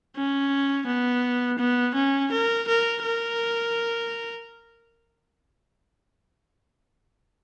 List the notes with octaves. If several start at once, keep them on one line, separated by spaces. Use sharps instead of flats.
C#4
B3
B3
C#4
A#4
A#4
A#4